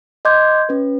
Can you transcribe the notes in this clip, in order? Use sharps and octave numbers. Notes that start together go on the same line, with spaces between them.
D#5 C6 D6 G6 G#6
C#4 B4